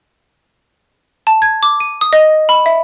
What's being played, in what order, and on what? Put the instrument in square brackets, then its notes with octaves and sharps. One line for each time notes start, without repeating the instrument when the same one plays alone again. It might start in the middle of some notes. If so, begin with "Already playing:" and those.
[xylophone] A5
G#6
D6
D#7
D#6
D#5
B5
E5